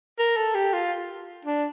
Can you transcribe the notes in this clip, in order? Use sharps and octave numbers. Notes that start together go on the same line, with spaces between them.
A#4
A4
G4
F4
D4